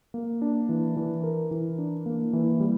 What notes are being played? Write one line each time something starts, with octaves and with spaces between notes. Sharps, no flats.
A#3
D4
E3
E3
A#4
E3
D4
A#3
E3
G3